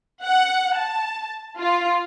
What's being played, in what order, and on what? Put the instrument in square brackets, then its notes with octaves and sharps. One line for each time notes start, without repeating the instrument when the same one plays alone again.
[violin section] F#5
A5
F4